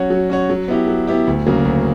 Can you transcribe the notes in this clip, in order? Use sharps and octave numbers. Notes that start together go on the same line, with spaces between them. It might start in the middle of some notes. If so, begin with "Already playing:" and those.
Already playing: F#3 C#4 F#4 C#5
F#3
C#4 F#4 C#5
F#3
B3 E4 G4
F#3
B3 E4 G4
D2
C#3 F#3 A#3
D2